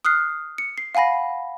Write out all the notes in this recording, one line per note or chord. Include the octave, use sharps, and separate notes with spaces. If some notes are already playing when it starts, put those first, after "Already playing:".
D#6 F6 F#6 C7
C#7
C7
F5 F#5 G#5 B5 A#6